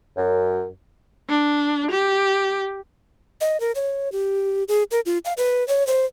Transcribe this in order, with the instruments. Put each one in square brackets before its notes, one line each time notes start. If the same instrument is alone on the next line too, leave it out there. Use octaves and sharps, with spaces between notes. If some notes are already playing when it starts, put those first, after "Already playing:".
[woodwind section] F#2
[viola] D4
G4
[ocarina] D#5
A#4
C#5
G4
G#4
A#4
F4
F5
B4
C#5
C5